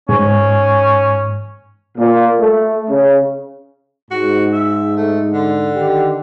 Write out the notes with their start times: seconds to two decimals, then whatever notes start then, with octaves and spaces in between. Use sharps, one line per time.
0.09 G#2 C#4
1.97 A#2
2.40 A3
2.89 C#3
4.11 G#2 F#4
4.53 E5
4.96 A3
5.33 D3
5.76 D#3 G4